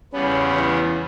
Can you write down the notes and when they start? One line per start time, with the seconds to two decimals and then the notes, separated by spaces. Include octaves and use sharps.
0.13 E2 C#3 G3 B3 C#4
0.54 E3